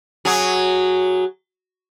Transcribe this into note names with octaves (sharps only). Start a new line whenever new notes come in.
F#3 G#4